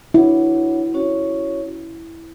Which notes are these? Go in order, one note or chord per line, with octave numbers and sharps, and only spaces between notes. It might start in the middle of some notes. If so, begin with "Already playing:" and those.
D4 E4 F#4 C#5 F#5
C#4 F#4 C#5